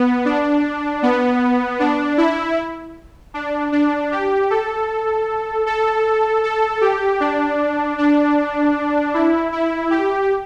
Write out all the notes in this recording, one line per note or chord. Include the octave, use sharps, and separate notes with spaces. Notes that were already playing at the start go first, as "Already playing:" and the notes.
Already playing: B3
D4
B3
D4
E4
D4
D4
G4
A4
A4
A4
G4
D4
D4
E4
E4
G4